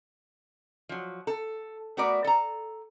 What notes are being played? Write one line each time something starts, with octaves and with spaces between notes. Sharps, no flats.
F3 F#3
A4
A3 B3 F#4 A#4 B4 D5
A4 A#5